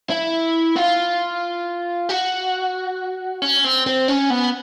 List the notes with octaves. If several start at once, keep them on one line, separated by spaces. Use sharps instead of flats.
E4
F4
F#4
C#4
C4
C4
C#4
B3